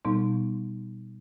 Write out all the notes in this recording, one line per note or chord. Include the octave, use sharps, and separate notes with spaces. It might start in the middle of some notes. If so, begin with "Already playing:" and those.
B2 G3 B3 D#4